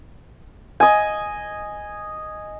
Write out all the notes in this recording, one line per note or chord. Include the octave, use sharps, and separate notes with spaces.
D#5 G#5